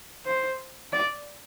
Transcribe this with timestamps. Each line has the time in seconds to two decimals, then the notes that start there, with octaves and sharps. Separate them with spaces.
0.26 C5
0.93 D5